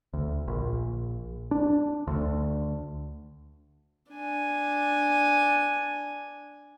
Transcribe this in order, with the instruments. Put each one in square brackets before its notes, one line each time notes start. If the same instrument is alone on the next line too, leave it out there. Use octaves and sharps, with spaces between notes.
[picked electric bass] D2
A#1
D4
D2
[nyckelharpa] D4 G#5